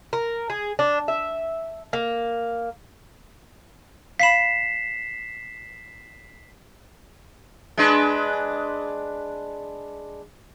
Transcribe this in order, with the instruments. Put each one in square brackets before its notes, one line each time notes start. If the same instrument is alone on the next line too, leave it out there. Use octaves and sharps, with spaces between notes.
[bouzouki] A#4
G#4
D4
E5
A#3
[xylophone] F5 B5 [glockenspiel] B6 C7 E7
[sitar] G#3 D4 B4